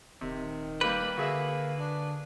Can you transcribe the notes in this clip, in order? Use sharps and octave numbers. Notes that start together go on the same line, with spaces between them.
D#1 C3 D#3
G3 A#3 G4 B4
D3 A#3 F#4 G#4 E5
D4